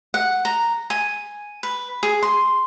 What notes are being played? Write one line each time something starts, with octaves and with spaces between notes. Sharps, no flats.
F#5
A#5
G#5
B4
G#4
C6